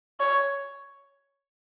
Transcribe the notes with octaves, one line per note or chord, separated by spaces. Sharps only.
C#5